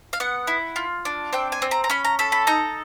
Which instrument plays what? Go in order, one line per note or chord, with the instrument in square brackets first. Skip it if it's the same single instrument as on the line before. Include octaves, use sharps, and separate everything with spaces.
[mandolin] F5
B3 F#5
E4
F4
D4
C4 G5
G#5
C4
A#5
A#5
C#4 B5
A#5
A4 B5
B5
D#4 A#5